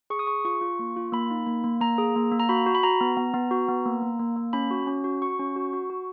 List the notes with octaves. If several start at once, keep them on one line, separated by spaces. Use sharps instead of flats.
G#4 C#6
D#6
G#4 C#6
F4 C#6
F4
A#3
F4
A#3 B5
D#4
A#3
A#3
A#3 A#5
G#4
A#3
A#3
A#5
F#4 B5
F#4
B5
F#4 A#5
B3
B3
B3
F#4
B3
A#3
A#3
A#3
A#3
C#4 B5
F#4
C#4
F#4
F#4 C#6
C#4
F#4
F#4
F#4